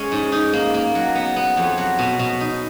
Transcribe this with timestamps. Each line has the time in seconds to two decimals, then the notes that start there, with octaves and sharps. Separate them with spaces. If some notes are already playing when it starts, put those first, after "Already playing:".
Already playing: G#3 C#4
0.12 G#2
0.32 D#4
0.53 A#3
0.74 A#3
0.95 F#3
1.15 B3
1.36 B3
1.57 F2
1.78 F#3
1.99 B2
2.19 B2
2.41 D#4